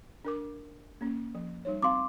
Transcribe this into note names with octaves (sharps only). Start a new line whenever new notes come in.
D4 A#4 D6
A#3 C#4
F3
G3 D#4 C#5
C4 F#4 F5 C6 D6